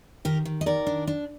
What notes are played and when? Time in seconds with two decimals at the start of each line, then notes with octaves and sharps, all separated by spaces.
0.25 D#3 G4 A#4
0.45 D#3
0.61 D#5
0.66 D#3 A#4 D5
0.87 D4
1.07 D4